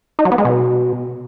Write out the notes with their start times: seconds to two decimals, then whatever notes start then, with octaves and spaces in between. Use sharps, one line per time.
0.19 D#4
0.25 F#3
0.32 B3
0.38 G#3
0.45 B2